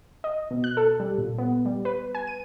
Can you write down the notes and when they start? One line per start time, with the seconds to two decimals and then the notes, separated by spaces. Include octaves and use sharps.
0.24 D#5
0.51 B2
0.64 F#6
0.77 A4
1.00 G3
1.18 A#2
1.38 B3
1.66 G3
1.85 B4
2.15 G#5
2.27 D#7